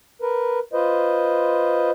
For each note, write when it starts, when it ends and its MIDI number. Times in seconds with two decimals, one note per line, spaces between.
0.21 0.59 70
0.21 0.59 71
0.73 1.91 65
0.73 1.91 71
0.73 1.91 72
0.73 1.91 75